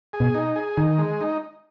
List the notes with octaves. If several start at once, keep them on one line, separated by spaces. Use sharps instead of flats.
G#4
B2
D#4
G#4
D#3 D#4
G#3
D#4